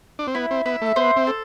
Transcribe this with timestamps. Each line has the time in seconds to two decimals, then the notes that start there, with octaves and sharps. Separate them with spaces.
0.19 D4
0.27 C4
0.35 B3 E4
0.51 C4
0.66 B3 E5
0.82 A3
0.96 B3 C5
1.16 C4
1.27 A4